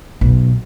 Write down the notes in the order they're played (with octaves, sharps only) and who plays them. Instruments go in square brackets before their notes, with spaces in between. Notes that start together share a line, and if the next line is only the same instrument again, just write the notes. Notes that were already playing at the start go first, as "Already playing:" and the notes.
[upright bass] B1